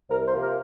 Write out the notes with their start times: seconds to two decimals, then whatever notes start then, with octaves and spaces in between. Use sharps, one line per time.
0.10 C2 A#4
0.25 C5
0.34 C3 F3 A#3
0.41 A#4